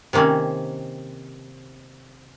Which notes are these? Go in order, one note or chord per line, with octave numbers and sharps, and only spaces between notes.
C3 D#3 A#3 C4 C#4